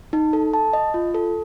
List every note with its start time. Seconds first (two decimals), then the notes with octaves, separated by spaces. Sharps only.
0.13 D#4
0.33 A4
0.54 A5
0.73 D#5
0.94 F4
1.15 A4